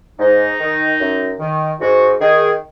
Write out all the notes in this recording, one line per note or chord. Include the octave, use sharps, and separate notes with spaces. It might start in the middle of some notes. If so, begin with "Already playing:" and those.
G#2 D#4
D#3
F#2
D#3
G#2 F#4
D#3 G#4